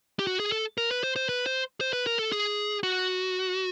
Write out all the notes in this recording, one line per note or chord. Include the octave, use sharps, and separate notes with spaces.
G4
F#4
G#4
A4
A#4
B4
C5
C5
B4
C5
C5
B4
A#4
A4
G#4
F#4